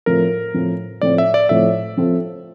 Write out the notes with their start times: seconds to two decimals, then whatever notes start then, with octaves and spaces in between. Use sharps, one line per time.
0.06 A2 F3 A3 C4 A#4
0.54 A2 F3 A3 C4
1.02 A2 F3 A3 C4 D5
1.18 E5
1.34 D5
1.49 A2 F3 A3 C4 E5
1.97 F3 C4 F4 A4